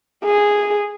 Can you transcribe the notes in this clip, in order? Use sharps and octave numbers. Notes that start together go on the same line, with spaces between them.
G#4